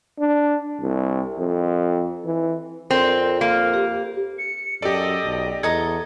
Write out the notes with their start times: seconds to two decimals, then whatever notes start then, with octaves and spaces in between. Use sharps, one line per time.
0.19 D4
0.82 C2
1.39 F2
2.25 E3
2.91 F2 C4 A#4 D5
3.41 A#3
3.74 G4
4.38 C#7
4.82 F#2 G4 A4 D5 D#5
5.24 B1
5.63 E2 A4 D#5 A#5 G#6